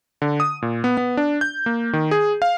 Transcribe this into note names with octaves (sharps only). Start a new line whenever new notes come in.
D3
D#6
A#2
B3
B3
D4
G6
A#3
D#3
G#4
F5